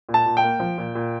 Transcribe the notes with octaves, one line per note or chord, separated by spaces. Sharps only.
A#2
A5
A#2
G5
A#3
F3
A#2
A#2